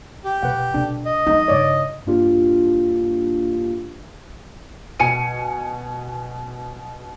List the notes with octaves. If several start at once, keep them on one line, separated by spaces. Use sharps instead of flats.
G4
B2 B4 F#5
B2 D3 D4
D#5
F3 G#3 D#4
G2 C#3 C#5 D5
G2 A#3 D4 F4 G4
B2 G#5 C#7 D#7